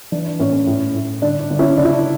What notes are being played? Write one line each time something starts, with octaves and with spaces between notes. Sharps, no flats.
E3 D4
D4
A2 C#4
C#4
A2
A2
G1 D4
D4
G1
C#4 E4
F#1 D4
E4
D4